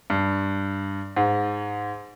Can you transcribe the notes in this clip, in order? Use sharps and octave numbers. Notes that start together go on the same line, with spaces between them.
G2
G#2